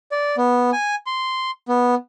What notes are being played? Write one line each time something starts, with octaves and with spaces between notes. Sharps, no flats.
D5
B3
G#5
C6
B3